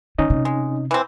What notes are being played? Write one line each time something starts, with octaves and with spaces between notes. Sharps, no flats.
D3 C#4 D#4 D#5
C3
G#3
E3 C4